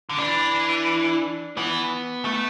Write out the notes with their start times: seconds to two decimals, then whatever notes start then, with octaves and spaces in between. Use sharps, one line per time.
0.09 D3
0.19 E3 D4
1.57 E3 B3
2.25 A3